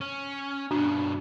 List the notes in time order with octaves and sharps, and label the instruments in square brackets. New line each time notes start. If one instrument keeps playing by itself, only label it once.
[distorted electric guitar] C#4
[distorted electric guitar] G2 B2 [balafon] D4 F#4